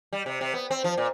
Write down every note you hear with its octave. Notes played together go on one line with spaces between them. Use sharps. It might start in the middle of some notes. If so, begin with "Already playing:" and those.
G3
C3
C3
B3
C4
F3
A#2